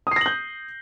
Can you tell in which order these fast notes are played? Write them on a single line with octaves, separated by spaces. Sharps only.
D#6 C7 A#6 F#7 G6